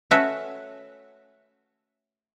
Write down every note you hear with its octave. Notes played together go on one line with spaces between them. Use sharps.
A3 C#4 F#4 B4 C#5 E5